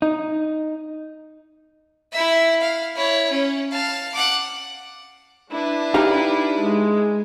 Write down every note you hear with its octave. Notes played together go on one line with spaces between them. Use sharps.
D#4
E4 E5
F5
E4 C#5
C#4
F5 A5
F#5 D6
D4 E4 B4
D#4 G4 F5
G#3